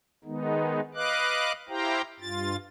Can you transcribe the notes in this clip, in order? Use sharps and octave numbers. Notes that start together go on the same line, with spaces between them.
D#3 G#3 B3 D#4
B4 D#5 F5 D6 F#6
E4 G4 C5 F5 G5 A#5
G2 F4 A6